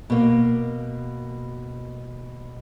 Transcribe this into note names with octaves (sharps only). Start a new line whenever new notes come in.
B2 A#3